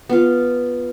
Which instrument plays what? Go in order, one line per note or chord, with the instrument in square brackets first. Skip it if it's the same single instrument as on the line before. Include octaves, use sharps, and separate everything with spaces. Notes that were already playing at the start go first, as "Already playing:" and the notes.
[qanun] B3 F4